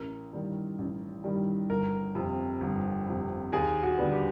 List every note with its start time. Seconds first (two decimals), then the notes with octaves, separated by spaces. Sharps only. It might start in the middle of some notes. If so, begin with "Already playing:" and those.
Already playing: A1 A#4
0.33 G2 D#3 G3
0.78 A1
1.24 G2 D#3 G3
1.70 G1 A#4
2.15 F2 C3
2.61 G1
3.07 F2 C3
3.52 D#2 G#4
3.83 F#4
3.98 D3 G3 B3
4.13 G4